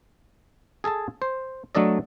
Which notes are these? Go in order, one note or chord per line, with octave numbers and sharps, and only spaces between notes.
G#4 A4 G#5 A5
C5
F#3 A3 D4 A4 D5 D#5